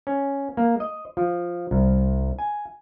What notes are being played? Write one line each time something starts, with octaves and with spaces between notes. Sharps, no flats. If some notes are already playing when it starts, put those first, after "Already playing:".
C#4
A#3
D#5
F3
C2
G#5